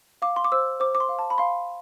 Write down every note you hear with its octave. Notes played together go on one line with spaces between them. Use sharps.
F5 D6
C6
D6
C5 E6
C5 D6
D6
C6
F5
A5
B5
F5 C6